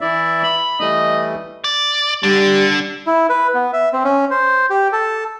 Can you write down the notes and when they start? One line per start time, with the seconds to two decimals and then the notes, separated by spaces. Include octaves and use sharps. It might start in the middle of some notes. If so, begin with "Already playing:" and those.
0.01 E3 E4 D5 E5
0.43 B5
0.80 E3 G3 A3 D#5
1.64 D5
2.23 D3 G3 D4
3.07 E4
3.30 B4
3.54 B3
3.73 E5
3.93 C4
4.04 C#4
4.31 C5
4.70 G4
4.92 A4